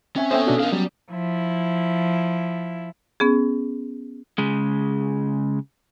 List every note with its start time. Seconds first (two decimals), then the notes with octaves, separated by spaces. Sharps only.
0.16 C4 C#4 E5 G#5
0.31 B3 C#4 A4 C5 C#5 E5 G5 D#6
0.47 B2 D4 F#4
0.60 D4 A#4 F5
0.73 F#3 G3
1.10 F3 E4
3.20 B3 C#4 G#4
4.38 C#3 G#3